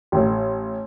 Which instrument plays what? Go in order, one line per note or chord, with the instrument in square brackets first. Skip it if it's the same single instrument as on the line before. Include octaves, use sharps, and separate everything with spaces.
[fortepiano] A1